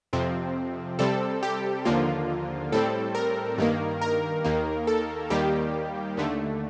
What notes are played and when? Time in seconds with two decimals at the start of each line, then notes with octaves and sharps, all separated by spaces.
0.13 F2 C3 F3 C4
0.99 C3 G3 C4 A4
1.43 G4
1.85 D#2 D3 F3 A#3 F4
2.72 A2 G3 C4 A4
3.15 A#4
3.58 G2 D#3 A#3
4.01 A#4
4.44 D#2 D#3 A#3
4.87 A4
5.30 D#2 D#3 G3 A#3 G4
6.17 D#2 D3 A3